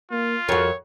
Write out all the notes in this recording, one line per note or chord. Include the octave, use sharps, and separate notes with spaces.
A#3 F4
F2 F#4 A#4 C#5